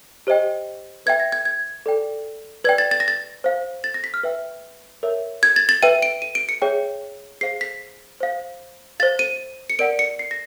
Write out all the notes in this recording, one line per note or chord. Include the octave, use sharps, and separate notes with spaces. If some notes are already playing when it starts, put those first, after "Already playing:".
G4 C5 D#5 G5
B4 E5 G5 G#6
A#6
G#6
G#6
A4 D5 G5
B4 D5 G5 G#6
A6
A6
A#6
A6
C5 F5
A6
A#6
B6
F6
B4 E5 G5
A#4 C#5 E5
G#6
A6
A6
B4 E5 G5 D#7
D7
D#7
D7
C#7
G#4 C#5 E5 G5
G#4 C5 F5 C7
B6
C5 F5
C5 F5 A6
D#7
C#7
A#4 D5 F#5 D7
C#7
C7
A#6